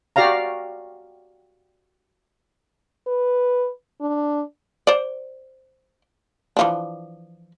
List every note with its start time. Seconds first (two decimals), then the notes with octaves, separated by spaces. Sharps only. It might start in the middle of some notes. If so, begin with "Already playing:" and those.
0.16 F#4 G4 D5 F5 A#5
3.07 B4
4.01 D4
4.87 C5 D5
6.57 E3 F3 D4